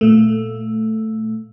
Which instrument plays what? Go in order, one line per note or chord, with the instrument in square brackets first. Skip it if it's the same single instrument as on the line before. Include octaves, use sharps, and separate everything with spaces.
[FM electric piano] A#2 A3